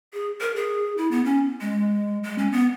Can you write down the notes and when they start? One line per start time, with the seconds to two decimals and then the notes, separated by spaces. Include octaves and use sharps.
0.13 G#4
0.41 A#4
0.56 G#4
0.97 E4
1.11 B3
1.25 C#4
1.61 G#3
2.24 G#3
2.38 C#4
2.52 B3